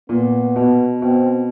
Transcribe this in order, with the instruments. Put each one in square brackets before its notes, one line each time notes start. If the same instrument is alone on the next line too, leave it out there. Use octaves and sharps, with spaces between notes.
[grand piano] A#2 [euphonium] B3
[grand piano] B2
[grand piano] B2 [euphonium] C4